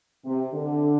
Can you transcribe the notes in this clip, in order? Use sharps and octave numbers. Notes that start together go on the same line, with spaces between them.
C3
D3